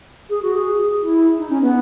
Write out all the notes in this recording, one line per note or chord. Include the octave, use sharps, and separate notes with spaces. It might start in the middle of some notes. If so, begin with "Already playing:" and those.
G#4
F#4
G#4
E4
D#4
C#4
B3